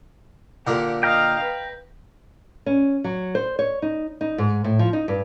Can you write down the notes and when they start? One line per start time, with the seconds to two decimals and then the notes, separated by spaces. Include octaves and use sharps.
0.67 A#2 D3 A#3 G4
1.03 D#5 F5 G5 A#5 F6
1.42 B4
2.66 C#4
3.04 F#3
3.35 C5
3.59 C#5
3.82 D#4
4.21 D#4
4.38 G#2
4.64 A2
4.79 F3
4.93 D#4
5.08 G2